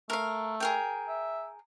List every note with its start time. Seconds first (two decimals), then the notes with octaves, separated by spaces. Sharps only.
0.10 A3 A#4 F5
0.60 G#4 A#4 G5
1.08 E5